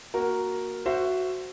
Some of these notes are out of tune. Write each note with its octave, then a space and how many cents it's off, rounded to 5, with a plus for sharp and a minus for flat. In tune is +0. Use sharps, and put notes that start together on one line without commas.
A#3 +0 F#4 +0 A#4 +0
F#4 +0 C5 +0 E5 +25